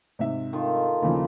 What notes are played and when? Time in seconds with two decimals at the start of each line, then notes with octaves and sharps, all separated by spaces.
0.19 G#2 C3 E5
0.53 D#3 A3 F4
1.02 D#2 C#3 E3 F3